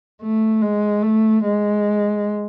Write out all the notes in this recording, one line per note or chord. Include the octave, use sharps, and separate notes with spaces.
A3
G#3
A3
G#3